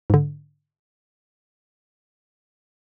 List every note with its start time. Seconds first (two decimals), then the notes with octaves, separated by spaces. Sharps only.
0.10 G#2 D3